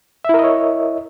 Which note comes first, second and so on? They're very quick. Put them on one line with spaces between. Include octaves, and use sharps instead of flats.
E5 E4 A#4 D#5 C#5